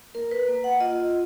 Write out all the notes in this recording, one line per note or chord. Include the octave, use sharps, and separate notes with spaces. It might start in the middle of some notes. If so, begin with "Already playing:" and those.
A#3 A#4
B4
A#3
F#5
F4 D#5